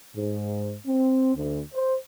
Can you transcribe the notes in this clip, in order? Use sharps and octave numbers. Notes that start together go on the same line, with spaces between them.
G#2
C4
D2
C5